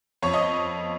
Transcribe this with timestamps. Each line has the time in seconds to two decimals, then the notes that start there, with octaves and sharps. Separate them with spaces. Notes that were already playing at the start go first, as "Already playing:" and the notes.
0.22 F2 C#5 C#6
0.34 D#5 D#6